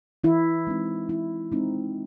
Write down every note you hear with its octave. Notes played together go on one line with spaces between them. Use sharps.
E3 E4
G#3 C4 D#4
E3 E4
G#3 C4 D#4